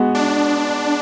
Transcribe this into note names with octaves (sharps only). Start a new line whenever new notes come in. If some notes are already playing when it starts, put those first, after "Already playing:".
Already playing: G#3 B3 F#4
D4